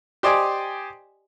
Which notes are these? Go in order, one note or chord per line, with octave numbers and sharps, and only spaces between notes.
G4 C5 D5 D#5 G#5